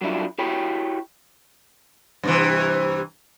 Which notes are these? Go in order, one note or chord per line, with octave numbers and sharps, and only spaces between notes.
F#3 G3 D4 E4 F4
E4 F#4 G4 C#5 G5 B5
G2 C3 E3